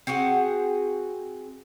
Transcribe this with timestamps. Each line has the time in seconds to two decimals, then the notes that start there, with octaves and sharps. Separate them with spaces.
0.07 C4 F#4 G#4 F#5